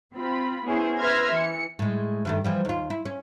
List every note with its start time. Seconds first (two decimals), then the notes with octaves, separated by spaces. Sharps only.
0.14 C4 F4 B5
0.66 B3 C#4 E4 G#4 C5
0.98 B4 E5 C6 F6 G#6 A#6
1.33 E3 C#7
1.79 A2 G#3
2.25 G2 D#3 A3
2.44 E3 F3 G3
2.65 D#2 F4
2.90 E4
3.05 C#4